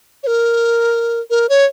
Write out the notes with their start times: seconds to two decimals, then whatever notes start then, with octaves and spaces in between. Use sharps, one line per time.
0.23 C#5
0.27 A#4
1.30 A#4
1.49 C#5